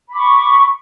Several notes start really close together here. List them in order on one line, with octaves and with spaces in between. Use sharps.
B5 D6 C#6